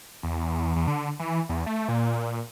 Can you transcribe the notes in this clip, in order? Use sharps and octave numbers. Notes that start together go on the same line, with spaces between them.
E2
E2
D3
E3
E2
A3
A#2